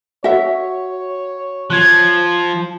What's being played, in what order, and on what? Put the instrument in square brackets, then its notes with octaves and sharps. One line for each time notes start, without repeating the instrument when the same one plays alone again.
[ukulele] F#4 E5 [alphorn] C#5
[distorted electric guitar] F3 [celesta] F#6 G#6